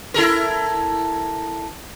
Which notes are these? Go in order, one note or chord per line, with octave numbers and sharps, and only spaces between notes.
E4 A4 A#4